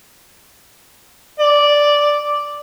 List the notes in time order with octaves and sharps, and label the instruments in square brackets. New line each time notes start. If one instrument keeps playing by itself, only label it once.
[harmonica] D5